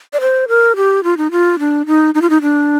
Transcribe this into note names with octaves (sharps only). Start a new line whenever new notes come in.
D5
C5
A#4
G4
F4
D#4
F4
D4
D#4
D#4
F4
D#4
D4